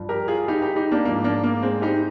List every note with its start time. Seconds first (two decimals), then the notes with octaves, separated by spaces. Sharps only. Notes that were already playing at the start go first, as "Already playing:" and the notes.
Already playing: G2 F3
0.09 G4 A#4
0.28 F4 G#4
0.48 D#4 G4
0.62 D#4 G4
0.76 D#4 G4
0.91 A#3 D4
1.05 G#2 F3 A#3
1.24 A#3 D4
1.44 A#3
1.63 G#3 C4
1.82 D#4 G4